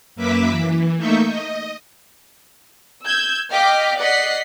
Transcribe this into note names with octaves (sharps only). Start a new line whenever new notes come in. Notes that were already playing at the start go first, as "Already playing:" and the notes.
F#2 A#3 B4 E5 D6 B6
E3
A3 A#3 D#4 E5 C#6 G6
D#5
E6 G6 G#6
D#5 F5 G5 D6 F6 B6
D5 D#5 F#5 B6 C7